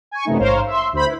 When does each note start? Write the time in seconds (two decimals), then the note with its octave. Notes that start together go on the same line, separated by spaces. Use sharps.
0.11 G#5 C#6
0.25 F#2 C3 E3 A3 D#4
0.39 A1 G#2 A#4 C5 C#5 F5
0.67 E5 C6
0.93 D2 C5 B5
1.06 E4 B4